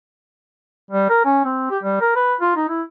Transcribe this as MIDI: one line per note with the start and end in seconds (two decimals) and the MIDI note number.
0.91 1.09 55
1.10 1.20 70
1.25 1.40 61
1.45 1.65 60
1.70 1.78 67
1.83 1.97 55
2.01 2.11 70
2.16 2.35 71
2.41 2.51 65
2.56 2.68 63
2.69 2.82 64